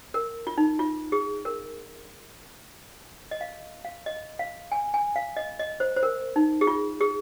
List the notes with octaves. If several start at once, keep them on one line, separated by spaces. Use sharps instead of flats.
A#4
F4
D#4
F4
G#4
A#4
D#5
F5
F5
D#5
F5
G#5
G#5
F5
D#5
D#5
C5
C5
A#4
D#4
G#4
F4
G#4